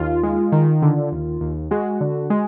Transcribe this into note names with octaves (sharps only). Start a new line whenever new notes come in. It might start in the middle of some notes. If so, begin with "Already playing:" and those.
Already playing: D#2 F4
G#3
D#3
D3
D#2
D#2
G#3 F#4
D3
G#3